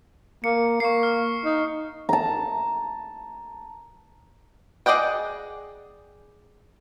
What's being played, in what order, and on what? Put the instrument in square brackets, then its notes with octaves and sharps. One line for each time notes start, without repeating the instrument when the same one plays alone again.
[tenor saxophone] A#3 [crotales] C#7
[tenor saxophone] A#3 [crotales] C#6 C7
[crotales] F6
[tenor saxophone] D#4
[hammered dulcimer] A5 A#5
[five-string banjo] G#4 D5 D#5 F#5 G5